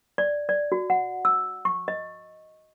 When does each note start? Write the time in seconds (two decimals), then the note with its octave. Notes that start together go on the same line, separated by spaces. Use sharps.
0.18 D5
0.49 D5
0.72 F#4
0.90 F#5
1.25 E6
1.65 C#6
1.88 D#5